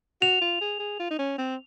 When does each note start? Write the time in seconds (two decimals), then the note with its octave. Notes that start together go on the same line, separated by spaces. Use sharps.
0.22 F#4 F7
0.42 F4
0.61 G#4
0.80 G#4
1.00 F4
1.11 D#4
1.19 C#4
1.38 C4